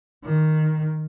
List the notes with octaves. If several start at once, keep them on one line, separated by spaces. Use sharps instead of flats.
D#3